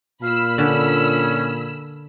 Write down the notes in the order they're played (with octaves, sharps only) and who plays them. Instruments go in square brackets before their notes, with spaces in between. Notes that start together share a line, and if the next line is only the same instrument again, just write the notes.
[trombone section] A#2 [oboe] F5 [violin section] B5 E6
[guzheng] D3 [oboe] C#4